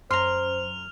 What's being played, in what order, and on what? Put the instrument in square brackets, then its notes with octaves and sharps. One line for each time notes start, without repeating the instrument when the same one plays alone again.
[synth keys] F#2 [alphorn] C5 [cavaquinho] A#5 C6 [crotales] F6 F7